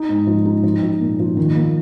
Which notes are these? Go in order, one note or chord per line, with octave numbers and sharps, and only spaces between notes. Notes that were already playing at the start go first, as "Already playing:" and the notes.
Already playing: D#4
G#2
F3
D#4
F3
F3
A#2
F3
D#3
A#3